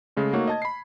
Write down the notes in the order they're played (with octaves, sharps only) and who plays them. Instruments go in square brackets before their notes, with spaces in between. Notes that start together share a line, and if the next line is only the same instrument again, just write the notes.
[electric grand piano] C#3 G#3 A3
A3 A#3 D#4 F#4 C#5
D#5 A5 G#6
B5 C7